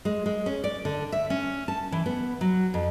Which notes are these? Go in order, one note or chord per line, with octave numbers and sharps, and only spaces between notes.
G#3
G#3
C#4
D5
D3
E5
C#4
A5
E3
B3
F#3
F2